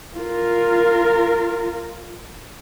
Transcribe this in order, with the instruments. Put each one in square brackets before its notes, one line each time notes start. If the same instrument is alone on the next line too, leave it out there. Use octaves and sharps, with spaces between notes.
[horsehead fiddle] F4 A#4